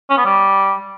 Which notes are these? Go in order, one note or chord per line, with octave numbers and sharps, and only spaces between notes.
C#4
B3
G3